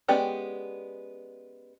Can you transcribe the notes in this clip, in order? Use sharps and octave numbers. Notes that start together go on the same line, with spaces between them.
G#3 B3 C#4 G4 D5